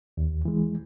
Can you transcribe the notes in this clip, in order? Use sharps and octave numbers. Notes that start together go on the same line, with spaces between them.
D#2
E3 G#3